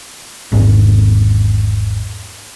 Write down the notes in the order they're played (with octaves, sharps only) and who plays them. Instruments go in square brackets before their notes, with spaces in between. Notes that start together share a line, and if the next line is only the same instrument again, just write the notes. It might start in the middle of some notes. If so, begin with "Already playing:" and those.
[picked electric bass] G#1 E2 G#2